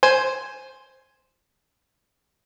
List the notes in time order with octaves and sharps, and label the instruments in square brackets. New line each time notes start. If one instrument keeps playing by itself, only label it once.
[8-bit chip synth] C5 G#5